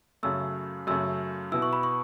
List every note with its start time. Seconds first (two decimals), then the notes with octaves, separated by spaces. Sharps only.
0.23 F#2 C#3 A3 E6
0.87 F#2 C#3 A3 E6
1.52 B2 B3 E4 E6
1.62 C#6
1.73 B5
1.83 C#6